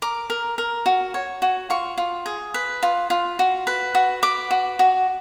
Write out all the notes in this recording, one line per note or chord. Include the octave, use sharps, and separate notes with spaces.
A#4 D6
A#4
A#4
F#4
C#5
F#4
F4 C#6
F4
G#4
B4
F4
F4
F#4
B4
F#4
B4 D6
F#4
F#4